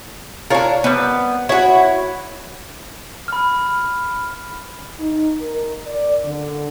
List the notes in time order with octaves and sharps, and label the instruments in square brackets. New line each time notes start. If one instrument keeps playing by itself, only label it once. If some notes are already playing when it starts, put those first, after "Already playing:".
[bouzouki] D4 A#4 [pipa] F4 C#5 C#6
[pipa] G3 C4 B4 [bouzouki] B3
[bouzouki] E4 F#4 [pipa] C#5
[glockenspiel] B5 F6
[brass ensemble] D#4
A#4
D5
D3